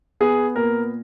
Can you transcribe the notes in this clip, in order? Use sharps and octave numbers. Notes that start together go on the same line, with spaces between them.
B3 G#4
A#2 A#4